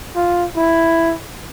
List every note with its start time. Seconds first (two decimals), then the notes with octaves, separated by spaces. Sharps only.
0.15 F4
0.56 E4